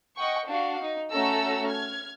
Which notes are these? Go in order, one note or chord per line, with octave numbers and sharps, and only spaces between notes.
D#5 F#5 G5 C#6
D4 F#4 F5
D#4
A3 C#4 F#4 A4 A#5 E6
F6 G#6